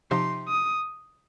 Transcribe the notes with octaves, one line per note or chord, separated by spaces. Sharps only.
C3 F3 D#4 G4 C6
D#6